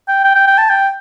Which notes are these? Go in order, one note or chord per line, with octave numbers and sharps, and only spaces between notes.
G5
G5
G5
G5
A5
G5